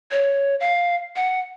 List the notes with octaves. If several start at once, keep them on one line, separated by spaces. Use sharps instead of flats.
C#5
F5
F#5